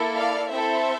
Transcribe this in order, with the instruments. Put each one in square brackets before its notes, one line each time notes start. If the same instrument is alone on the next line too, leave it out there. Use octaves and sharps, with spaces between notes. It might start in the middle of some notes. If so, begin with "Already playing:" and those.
Already playing: [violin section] A#3 E4 A4
D5 F5
C4 E4 A4 C5 E5